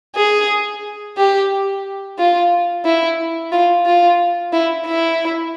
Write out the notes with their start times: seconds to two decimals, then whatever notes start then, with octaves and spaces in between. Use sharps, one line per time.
0.16 G#4
1.17 G4
2.18 F4
2.85 E4
3.52 F4
3.86 F4
4.53 E4
4.87 E4